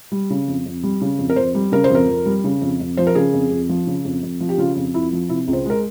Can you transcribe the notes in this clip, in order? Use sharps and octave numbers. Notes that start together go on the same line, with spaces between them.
G3
C#3
F2
F2
G3
C#3
F2
A#4
F2 C5
G3
C#3 A#4
C5
F2 A#4
F2
G3
C#3
F2
F2
F3 C5
A#4
C#3 G#4
F2
F2
F3
C#3
F2
F2
F3
G4
C#3 F4
F2
F2 E4
F3
C3 E4
C#2
C5
G#3 A#4